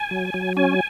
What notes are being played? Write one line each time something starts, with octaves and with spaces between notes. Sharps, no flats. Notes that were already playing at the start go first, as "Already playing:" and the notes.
Already playing: G#5
F#3
F#3
C#4 G#5